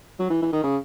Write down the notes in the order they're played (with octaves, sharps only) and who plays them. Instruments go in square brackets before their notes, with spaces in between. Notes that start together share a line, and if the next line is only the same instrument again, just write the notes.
[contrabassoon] F#3
E3
E3
D#3
C#3